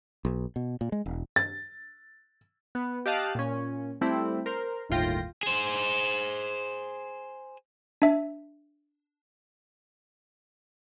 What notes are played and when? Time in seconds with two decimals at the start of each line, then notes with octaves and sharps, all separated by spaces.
0.25 B1
0.56 B2
0.81 A#2
0.92 G#3
1.06 E1
1.36 A6
2.75 B3
3.06 G4 D#5 F5 A5 F#6
3.35 A#2 C#4
4.01 G3 A3 C4 E4
4.46 A#4 C5
4.89 G1 D#2 A2 F4 G5 A#6
5.43 G#4 C5
8.02 D4 E5